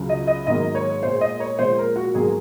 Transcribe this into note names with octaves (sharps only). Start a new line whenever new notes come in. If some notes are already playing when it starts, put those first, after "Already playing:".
Already playing: C#2 C#3 F#3
D#5
D#5
G#2 D#3 F#3 A#3 D#5
C#5
A#2 G#3 C5
D#5
C#5
A#2 F3 G#3 C5
A#4
F#4
G#2 F#3 A#3 G#4